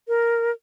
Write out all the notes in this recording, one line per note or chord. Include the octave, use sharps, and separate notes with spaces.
A#4